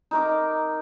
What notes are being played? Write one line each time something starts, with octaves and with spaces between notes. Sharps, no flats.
D#4 A#4 D6